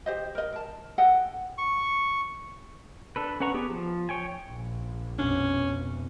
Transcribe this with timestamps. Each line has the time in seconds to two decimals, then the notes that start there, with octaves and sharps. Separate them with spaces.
0.06 G4 C5 D#5
0.35 A#4 D#5
0.52 A#4 A5
0.98 A4 D#5 F#5 G5
1.58 C#6
3.16 D4 A4 B4
3.40 C#4 B4 F#5 A#5 C#6
3.54 B3 G4 G#4
3.70 F3
4.09 C#5 G5 G#5
4.48 A#1
5.19 F2 B2 C#4 D4